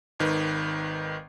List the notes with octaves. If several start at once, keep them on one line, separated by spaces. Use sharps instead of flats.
G#1 D#3 B4